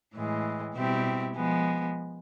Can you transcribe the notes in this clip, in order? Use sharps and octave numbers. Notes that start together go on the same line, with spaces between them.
A2 E3 G#3
B2 G3 C4 E4 G4
F3 G#3 B3